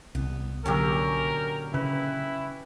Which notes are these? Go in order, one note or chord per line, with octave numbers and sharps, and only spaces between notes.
C2 B3
A#2 D3 F#3 C#4 G4 A#4 E6
C#3 E4 B4